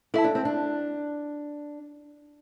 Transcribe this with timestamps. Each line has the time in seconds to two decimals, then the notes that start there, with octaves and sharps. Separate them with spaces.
0.14 E4 A4 E5 A5
0.24 D4
0.35 C4
0.45 D4